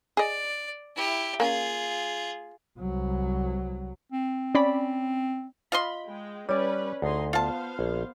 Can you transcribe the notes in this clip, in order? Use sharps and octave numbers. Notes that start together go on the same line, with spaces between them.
G#4 D5 D#5
E4 G4
A#3 C#4 F4 G#4
C2 F#3
C4
C#4 D5 B5
F4 D#5 B5 C6
G#3 G5
G3 C#4 B4 C#5 D5
D2 D#4 G#4 C6
B3 F4 C5 F5 A5
A#1